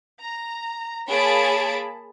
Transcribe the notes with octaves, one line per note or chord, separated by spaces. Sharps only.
A#5
A#3 G#4 C#5 A5 B5 D7